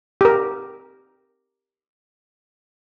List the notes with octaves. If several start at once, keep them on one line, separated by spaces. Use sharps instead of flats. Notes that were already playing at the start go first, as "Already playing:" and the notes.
G4 A#4